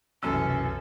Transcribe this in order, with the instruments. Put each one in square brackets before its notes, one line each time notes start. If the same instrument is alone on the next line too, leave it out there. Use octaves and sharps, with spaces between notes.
[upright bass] E1 C2 [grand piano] F#2 E6 [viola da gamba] E3 A4 [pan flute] C#4